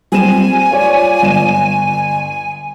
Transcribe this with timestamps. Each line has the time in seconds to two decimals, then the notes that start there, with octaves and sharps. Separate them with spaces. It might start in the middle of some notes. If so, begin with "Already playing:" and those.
0.12 G3 C4 G#5 E7
0.71 F4 C#5 D5
1.22 G1 E7